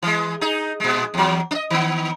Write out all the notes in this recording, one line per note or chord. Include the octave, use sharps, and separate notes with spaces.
E3 G#3
D#4 G#4
A#2 G#3
E2 F#3
D4 D#5
D#3 B3